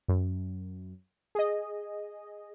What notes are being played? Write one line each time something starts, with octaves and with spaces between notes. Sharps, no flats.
F#2
G#4 D#5